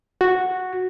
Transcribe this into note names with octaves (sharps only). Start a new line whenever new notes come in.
F#4